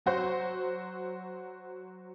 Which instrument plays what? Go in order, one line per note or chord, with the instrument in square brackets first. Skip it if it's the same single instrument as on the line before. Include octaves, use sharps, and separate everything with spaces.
[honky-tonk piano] F#3 F#4 C5